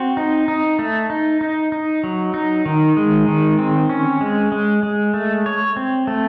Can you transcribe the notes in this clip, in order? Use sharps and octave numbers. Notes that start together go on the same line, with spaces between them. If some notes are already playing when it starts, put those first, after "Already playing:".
Already playing: C4 F#4
D#4
D#4
A3
D#4
D#4
D#4
F#3
D#4
D#3
G#3
D#3
C4
C#4
G#3
G#3
G#3
A3
C#5
C4
A3